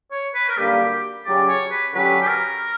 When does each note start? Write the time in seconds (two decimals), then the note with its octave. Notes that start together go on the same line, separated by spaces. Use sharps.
0.11 C#5
0.34 B4
0.49 A#4
0.58 F#2 D3 G3 A#3 G4
1.25 C#3 F#3 C#4 G4 D5
1.48 C#5
1.71 B4
1.93 D3 F#3 C#4 G4 B4
2.21 G4
2.27 A#4